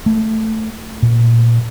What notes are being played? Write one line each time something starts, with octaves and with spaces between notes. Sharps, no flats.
A3
A#2